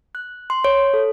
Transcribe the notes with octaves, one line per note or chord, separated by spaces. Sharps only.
F#6
C6
C#5
A4